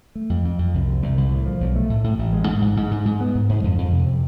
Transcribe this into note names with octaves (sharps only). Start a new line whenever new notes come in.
A3
F2
F2
F2
C2
C3
C2
C2
A2
F3
B1
A3
A2
A2
A1
G#3
G#2
G#2
G#2
G#2
G#2
B3
G#2
G#2
F2
F2
C3